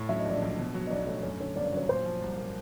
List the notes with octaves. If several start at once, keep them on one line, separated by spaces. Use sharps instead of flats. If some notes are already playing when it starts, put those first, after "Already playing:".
Already playing: A2
F#3 E5
D#5
A#1 D5
A#1 D#5
B2
F#3
D#5
B1 D5
A3 C#5
F#2 C#5
D3 C#5
G1 D5
D5
F#3 C#5
A#2 C5
F3
C2
A#3